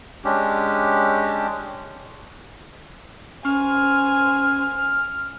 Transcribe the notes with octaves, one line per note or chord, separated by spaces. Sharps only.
G#3 C#4 D4 G4
C#4 C5 G#5 F6